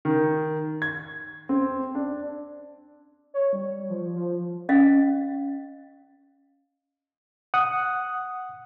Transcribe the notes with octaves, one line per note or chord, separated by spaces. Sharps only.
D#3
G#6
C4
D4
C#5
G3
F3
F3
C#4 D#5 F5
F#5 D#6